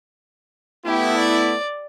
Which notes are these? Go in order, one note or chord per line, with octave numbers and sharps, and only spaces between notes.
A3 B3 E4 G4
D5